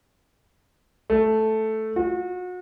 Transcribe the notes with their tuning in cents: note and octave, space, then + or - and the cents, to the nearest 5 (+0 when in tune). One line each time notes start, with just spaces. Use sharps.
A3 -5
F#4 -35